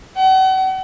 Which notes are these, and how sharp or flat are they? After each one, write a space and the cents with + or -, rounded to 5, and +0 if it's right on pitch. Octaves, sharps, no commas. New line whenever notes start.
F#5 +40